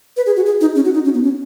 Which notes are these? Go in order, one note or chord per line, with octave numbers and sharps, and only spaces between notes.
B4
G#4
F#4
G#4
D#4
C#4
F#4
D#4
C#4
B3
C#4